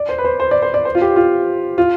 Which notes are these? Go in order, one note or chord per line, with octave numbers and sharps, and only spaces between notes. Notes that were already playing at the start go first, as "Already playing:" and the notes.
Already playing: D5
C5
B4
C5
C5
D5
C5
D5
C5
F4
G4
F4
F4